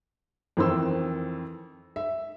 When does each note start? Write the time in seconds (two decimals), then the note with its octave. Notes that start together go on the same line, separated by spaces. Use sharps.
0.57 F2 D#3 E3 C4 C6 E6
1.96 E5